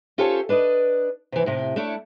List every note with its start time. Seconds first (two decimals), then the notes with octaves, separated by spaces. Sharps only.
0.18 C#4 F4 G4 A4 C5 C#5
0.49 D4 B4 D5 D#5
1.32 C3 E3
1.46 A2 C3
1.76 A3 D4 E4 C#5